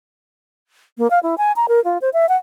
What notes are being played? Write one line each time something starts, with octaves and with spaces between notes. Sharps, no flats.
A#3
F5
E4
G#5
A#5
A#4
F4
C5
E5
F#5